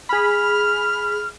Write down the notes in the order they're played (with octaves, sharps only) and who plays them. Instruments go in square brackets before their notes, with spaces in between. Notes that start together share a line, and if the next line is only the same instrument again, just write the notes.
[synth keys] G#4 B5 [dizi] F6